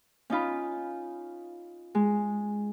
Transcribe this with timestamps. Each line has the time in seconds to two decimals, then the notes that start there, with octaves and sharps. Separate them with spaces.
0.30 C#4 D#4 F4 B5
1.95 G#3